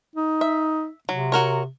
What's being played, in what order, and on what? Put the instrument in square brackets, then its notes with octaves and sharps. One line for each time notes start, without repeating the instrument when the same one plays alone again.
[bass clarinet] D#4
[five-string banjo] E5
[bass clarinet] C3 [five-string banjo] F#3
[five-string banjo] F#4 A#4 C#5